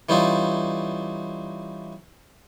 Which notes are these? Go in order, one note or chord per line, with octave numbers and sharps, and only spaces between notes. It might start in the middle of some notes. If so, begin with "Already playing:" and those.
E3 G3 C#4 D#4 F4